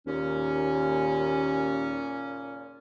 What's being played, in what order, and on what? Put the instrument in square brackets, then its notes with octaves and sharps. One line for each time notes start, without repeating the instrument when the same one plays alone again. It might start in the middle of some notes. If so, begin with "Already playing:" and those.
[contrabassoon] D#2 [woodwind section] A#2 C#3 C#4